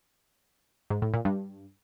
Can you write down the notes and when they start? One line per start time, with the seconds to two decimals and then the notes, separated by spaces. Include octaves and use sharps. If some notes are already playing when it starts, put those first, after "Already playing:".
0.90 G#2
1.02 A2
1.14 A#2
1.25 G2